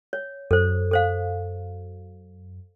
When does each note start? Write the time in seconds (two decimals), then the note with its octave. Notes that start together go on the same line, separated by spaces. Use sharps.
0.13 C#5
0.51 F#2 A4 C5
0.91 A4 C5 F5